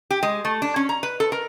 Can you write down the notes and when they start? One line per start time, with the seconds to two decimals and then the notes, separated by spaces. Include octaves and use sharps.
0.10 G4
0.23 G#3
0.45 A3
0.62 D4
0.76 C#4
0.89 A#5
1.03 B4
1.20 A4
1.32 A#4